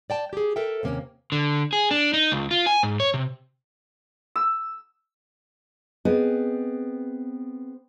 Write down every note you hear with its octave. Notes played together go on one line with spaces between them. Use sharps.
D5 G5 A5
G4 G#4
A4 A#4 E5 G5
D#2 C3 A#3 C#4
D3
G#4
D4
D#4
C#2
F4
G#5
G#2
C#5
C3
E6
B3 C4 G#4 B4 D#5